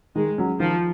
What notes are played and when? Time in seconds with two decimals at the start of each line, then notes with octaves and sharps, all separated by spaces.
0.15 D#3 G#3
0.38 F#3 C#4
0.60 D#3 F3